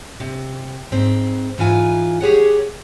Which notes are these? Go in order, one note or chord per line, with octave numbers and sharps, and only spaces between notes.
C3
G#2 C4
G#2 E3 F4 G#5
G4 G#4 C#5 F#5